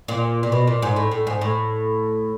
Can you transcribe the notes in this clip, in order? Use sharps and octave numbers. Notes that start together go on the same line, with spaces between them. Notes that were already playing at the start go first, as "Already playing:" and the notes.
A#2
A#2
B2
A#2
G#2
A2
A2
G#2
A2